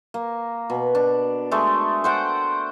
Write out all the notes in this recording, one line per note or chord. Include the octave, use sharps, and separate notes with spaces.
A#3
B2
D4
G#3 A3
C5 F#5 G5